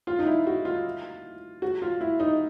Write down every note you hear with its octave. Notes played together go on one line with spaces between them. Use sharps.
F4
D#4
E4
F#4
F4
F#4
F4
E4
D#4